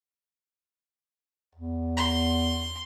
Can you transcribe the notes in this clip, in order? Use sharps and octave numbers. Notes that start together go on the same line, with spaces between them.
E2
C6